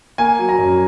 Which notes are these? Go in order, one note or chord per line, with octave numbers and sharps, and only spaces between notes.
A#3 G#5
F#3
A#5
F#2